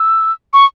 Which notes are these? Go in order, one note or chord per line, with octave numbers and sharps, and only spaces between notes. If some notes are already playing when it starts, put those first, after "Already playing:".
Already playing: E6
C#6